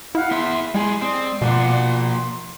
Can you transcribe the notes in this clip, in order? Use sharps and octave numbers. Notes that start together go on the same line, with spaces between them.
E4 F5 F#5 F6
B3 G#4 E5 C6
G3 G#3 G#4 C6
C4 D5 D#6
B2 F3 A#3 F4 D5 F#5
C6